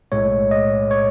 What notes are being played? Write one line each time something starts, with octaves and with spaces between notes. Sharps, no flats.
B1 A2 G#3 C#5
D#5
C#5